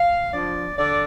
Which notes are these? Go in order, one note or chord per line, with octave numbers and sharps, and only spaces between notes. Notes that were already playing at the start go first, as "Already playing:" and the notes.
Already playing: F5
F3 D4 D5
D3 D5